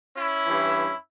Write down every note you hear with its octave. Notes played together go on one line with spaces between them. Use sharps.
C#4 E4
G2 E3